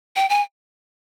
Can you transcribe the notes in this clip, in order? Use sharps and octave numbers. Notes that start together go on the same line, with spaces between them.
G5
G#5